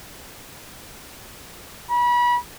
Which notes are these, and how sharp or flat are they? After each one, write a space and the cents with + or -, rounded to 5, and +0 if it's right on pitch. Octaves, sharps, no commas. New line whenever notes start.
B5 -30